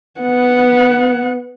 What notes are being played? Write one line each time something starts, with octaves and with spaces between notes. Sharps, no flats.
B3 F#5